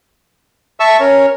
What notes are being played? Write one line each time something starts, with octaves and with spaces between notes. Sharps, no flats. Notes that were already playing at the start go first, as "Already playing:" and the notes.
E5 A5 C#6 E6
C#4 A#4 C#5